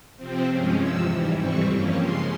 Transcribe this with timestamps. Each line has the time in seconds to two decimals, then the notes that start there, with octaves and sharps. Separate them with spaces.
0.17 C3 F3 C4
0.48 G2 F3 G#3 C#4
0.78 E2 C3 F3 E6
1.08 G#2 E3 G3
1.38 F2 E3 G3 C4 C#6
1.69 G2 F3 A#3 C#4
2.00 C#3 F3 G#3 C6